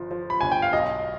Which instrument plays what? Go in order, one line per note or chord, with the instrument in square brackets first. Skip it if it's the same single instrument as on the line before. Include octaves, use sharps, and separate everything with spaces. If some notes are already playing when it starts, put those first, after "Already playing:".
Already playing: [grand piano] G1 F3
F3
B5
G1 G#5
G5
F5
B1 D#5